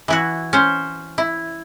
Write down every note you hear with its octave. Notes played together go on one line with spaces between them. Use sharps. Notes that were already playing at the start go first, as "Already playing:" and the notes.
E3 E4 F#4
C#4 C5
E4